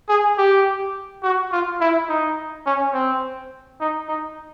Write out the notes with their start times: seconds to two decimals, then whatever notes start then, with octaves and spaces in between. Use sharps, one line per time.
0.08 G#4
0.38 G4
1.23 F#4
1.52 F4
1.81 E4
2.09 D#4
2.66 C#4
2.94 C4
3.80 D#4
4.08 D#4